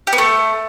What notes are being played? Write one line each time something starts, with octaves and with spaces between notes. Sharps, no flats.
G4
B3
A3